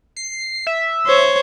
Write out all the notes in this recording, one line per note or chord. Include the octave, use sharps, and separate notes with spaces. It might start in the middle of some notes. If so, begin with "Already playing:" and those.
C7
E5
C5 C#5